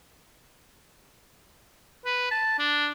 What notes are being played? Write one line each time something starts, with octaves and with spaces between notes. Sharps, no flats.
B4
A5
D4